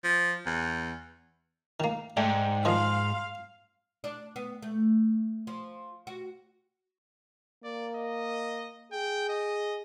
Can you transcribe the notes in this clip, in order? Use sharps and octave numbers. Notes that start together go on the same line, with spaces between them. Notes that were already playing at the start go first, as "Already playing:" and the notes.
F3
E2
D#3 A#3
G#2 A3 D5 G5
D#3 F3 D#5 F5 C6
D4
B3
A3
F3
F#4
A#3 D5
D#5
G#4 G5
D#5